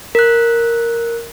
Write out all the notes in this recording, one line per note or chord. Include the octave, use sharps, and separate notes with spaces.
A#4 F#6